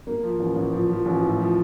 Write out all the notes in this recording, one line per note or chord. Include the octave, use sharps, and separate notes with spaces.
A#3
F3
A1
A1
F3
F3
A1
A2
F3